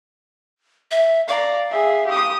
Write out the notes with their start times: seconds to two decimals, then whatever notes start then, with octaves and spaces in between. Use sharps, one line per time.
0.91 E5
1.28 D5 F5 A#5
1.70 G#4 E5
2.07 G4 D#6